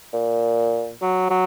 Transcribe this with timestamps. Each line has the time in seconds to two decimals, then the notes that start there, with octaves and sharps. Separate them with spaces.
0.14 A#2
1.02 F#3
1.30 F#3